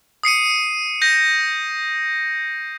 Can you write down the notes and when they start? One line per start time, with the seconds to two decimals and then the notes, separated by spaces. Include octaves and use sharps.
0.23 D#6 C7 C#7 D#7
1.02 G6 A#6